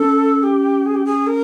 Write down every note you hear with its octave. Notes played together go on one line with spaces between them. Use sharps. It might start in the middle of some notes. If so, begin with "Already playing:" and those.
Already playing: C#4 A4
G4
G#4
G4
G#4
A#4